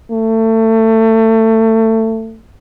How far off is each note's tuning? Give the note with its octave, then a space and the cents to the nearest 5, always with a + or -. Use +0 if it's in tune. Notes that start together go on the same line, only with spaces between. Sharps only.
A3 +25